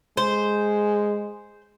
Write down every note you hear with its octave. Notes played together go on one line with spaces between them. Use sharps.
G#3 C5